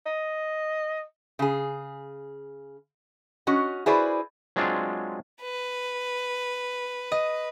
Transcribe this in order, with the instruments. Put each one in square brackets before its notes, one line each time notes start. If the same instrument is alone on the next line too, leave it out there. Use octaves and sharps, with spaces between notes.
[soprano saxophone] D#5
[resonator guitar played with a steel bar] C#3 G#4
C#4 F#4 D#5
E4 F#4 G#4 B4 C5 D5
[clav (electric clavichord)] F#3 G#3 C4 D4 F4
[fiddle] B4
[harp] D#5